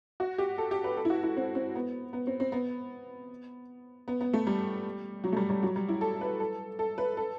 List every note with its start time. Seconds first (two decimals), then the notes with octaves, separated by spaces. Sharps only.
0.20 F#4
0.38 G4
0.58 A4
0.71 G4
0.84 B4
0.97 A4
1.05 E4
1.10 F#4
1.23 E4
1.37 C4
1.55 C4
1.75 B3
2.13 B3
2.27 C4
2.40 C4
2.52 B3
4.08 B3
4.21 B3
4.33 A3
4.47 G3
5.24 F#3
5.32 A3
5.36 G3
5.50 G3
5.63 F#3
5.76 G3
5.89 E4
6.01 A4
6.21 B4
6.40 A4
6.79 A4
6.98 B4
7.17 A4